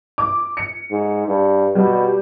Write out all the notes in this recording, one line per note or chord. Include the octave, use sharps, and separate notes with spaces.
D6
C#7
G#2
G2
B2 G3